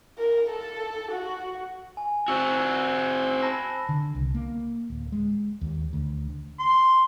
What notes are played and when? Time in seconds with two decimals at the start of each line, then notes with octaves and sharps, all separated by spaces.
0.18 A#4
0.50 A4
1.12 F#4
1.97 G#5
2.28 C4 F#4 E6 F#6
3.42 A5 B5 A#6
3.89 D3
4.15 C2
4.34 A#3
4.90 D1
5.12 G#3
5.61 D#2
5.93 D2
6.60 C6